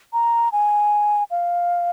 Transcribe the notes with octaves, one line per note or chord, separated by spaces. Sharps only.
A#5
G#5
F5